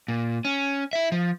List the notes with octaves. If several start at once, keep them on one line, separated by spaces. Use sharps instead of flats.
A#2
C#4
E4 E5
F3